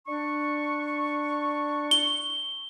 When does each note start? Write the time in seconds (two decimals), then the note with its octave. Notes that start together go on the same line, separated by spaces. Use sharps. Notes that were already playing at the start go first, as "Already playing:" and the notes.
0.07 D4 C#6
1.91 G7